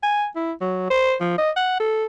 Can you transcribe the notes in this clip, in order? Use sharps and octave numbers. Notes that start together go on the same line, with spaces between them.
G#5
E4
F#3
C5
F3
D#5
F#5
A4